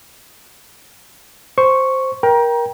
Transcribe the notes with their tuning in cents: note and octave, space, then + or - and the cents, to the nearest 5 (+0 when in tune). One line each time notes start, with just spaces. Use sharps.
C5 +0 C#6 +0
A#4 +20 G5 +0 A#5 +30